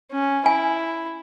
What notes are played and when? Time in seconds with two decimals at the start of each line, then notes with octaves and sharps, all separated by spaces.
0.11 C#4
0.46 E4 G#5